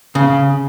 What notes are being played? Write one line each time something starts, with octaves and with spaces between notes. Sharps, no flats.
C#3